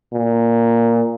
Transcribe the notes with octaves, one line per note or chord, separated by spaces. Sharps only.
A#2